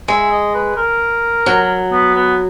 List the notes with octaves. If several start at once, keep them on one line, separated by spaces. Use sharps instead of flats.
G#3 E5
D#5
B4
A#4
F#3
B3
B3